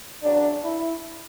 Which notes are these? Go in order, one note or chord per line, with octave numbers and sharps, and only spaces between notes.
E2 C#3 F#3 D4
E4